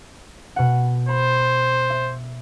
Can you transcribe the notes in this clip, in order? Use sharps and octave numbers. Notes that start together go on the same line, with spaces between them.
B2 F#5
C5 B5
E5